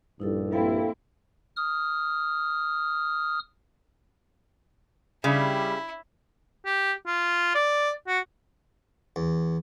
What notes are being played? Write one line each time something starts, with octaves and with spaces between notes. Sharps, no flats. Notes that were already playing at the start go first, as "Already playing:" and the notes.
A#1 G2 D#4 E4 A4
A#3 C4 E4 A4 F5 G5
D#6 F6
C#3 G3 E4
G4
F4
D5
F#4
E2